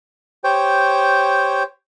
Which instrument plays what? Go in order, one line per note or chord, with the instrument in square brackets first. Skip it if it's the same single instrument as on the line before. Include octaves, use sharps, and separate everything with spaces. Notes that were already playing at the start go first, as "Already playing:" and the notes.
[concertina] G4 C5 C#5 G5